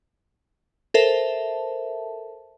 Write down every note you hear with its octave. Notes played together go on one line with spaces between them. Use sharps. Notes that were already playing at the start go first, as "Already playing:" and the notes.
A4 A#4 C5 E5 A5